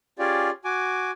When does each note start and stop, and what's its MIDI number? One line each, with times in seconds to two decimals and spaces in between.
0.19 0.50 61
0.19 0.50 65
0.19 0.50 67
0.19 0.50 68
0.19 0.50 74
0.65 1.11 66
0.65 1.11 80
0.65 1.11 86